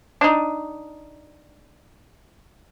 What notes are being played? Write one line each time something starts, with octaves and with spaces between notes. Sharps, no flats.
D4 D#4